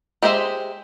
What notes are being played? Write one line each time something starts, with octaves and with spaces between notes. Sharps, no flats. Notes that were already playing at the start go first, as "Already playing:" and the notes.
G#3 G4 C5 D#5 E5